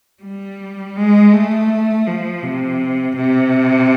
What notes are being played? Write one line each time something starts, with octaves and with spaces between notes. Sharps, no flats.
G3
G#3
A3
F3
C3
C3